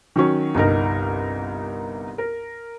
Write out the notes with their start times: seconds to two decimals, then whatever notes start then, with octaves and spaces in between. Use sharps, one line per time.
0.16 D#3 F#3 C#4
0.55 G1 C2 D#4 A#4
2.18 A#4